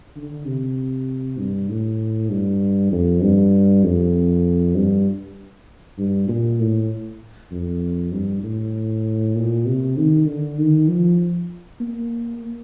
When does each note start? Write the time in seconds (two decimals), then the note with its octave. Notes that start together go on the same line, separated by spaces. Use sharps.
0.16 D3
0.46 C3
1.39 G2
1.69 A2
2.30 G2
2.92 F2
3.22 G2
3.84 F2
4.76 G2
5.98 G2
6.28 A#2
6.60 A2
7.51 F2
8.12 G2
8.43 A2
9.36 A#2
9.66 C3
9.97 D#3
10.27 D3
10.59 D#3
10.88 F3
11.81 A#3